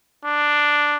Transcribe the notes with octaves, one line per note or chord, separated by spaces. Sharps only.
D4